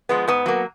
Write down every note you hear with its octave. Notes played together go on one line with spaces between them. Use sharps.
F3 G#3 B3
G#2 B3
F#3 A#3